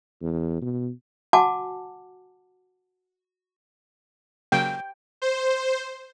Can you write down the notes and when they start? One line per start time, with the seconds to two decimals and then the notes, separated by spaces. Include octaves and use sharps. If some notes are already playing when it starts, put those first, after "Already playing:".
0.21 E2
0.62 B2
1.33 F#4 F#5 G#5 A5 D6
4.52 C#3 F#3 A#3 G5
5.22 C5